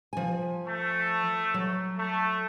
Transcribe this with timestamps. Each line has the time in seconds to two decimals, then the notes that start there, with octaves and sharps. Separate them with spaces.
0.13 F3 G#5
0.67 A3
1.54 F#3
1.98 A3